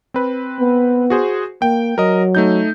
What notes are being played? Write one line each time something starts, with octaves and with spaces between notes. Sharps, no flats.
C4 B4
B3
F#4 G#4 C5
A#3 G5
F#3 A#4 D#5
A3 D#4 G6